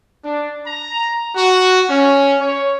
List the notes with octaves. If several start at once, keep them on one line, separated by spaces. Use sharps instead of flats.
D4
A#5
F#4
C#4
C#5